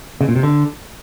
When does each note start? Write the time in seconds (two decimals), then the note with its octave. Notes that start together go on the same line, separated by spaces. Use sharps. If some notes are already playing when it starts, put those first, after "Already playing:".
0.21 C#3
0.28 A#2
0.36 C3
0.43 D3